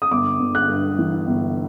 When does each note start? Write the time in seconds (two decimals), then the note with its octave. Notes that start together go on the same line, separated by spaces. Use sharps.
0.02 D#6
0.11 G1 D6
0.40 G1
0.55 F#6
0.69 G2
0.99 E3
1.27 G1